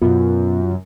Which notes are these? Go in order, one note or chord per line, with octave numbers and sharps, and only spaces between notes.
F#2 B2 B3 F4